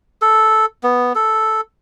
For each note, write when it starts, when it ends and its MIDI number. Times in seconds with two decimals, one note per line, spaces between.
0.22 0.66 69
0.83 1.13 59
1.15 1.61 69